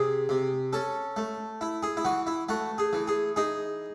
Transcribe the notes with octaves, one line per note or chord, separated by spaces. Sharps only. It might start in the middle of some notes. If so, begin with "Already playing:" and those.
Already playing: C3 G#4
C3
C#4 A4
A3
E4
G#4
E4
E3 F#4
E4
A3 F#4
G#4
E3
G#4
D#4 G#4